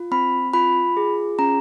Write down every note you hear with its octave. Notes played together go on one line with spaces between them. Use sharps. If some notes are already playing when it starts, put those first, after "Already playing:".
Already playing: F4
C4 B5
F4 B5
G#4
C#4 A#5